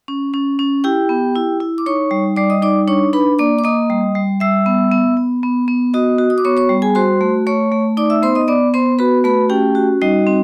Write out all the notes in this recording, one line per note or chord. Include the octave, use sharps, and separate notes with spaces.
C#4
C#4
C#4
E4 G4 G5
B3
E4
E4
D6
D#4 C#5 C#6
G3
G3 D5 D6
D#5 D#6
D#4 D5 D6
D4 C#5 C#6
D4 B4 B5
A#3 D5 D6
D6
A#3 D#5 D#6
G3
G3
G3 E5 E6
B3
B3
B3
B3
B3
F#4 D#5 D#6
F#4
D#6
D6
B3 C#5 C#6
C#5 C#6
G3
G#4 G#5
F#4 C5 C6
A3
A3 C#5 C#6
A3
D#4 D5 D6
E5 E6
B3 C5 C6
D#5 D#6
B3 D5 D6
B3 C5 C6
F#4 B4 B5
A3 B4 B5
C#4 G4 G5
F#4
G3 D#4 D#5
C4